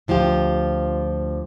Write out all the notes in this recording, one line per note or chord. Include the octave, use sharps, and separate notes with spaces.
D2 F3 F4 G4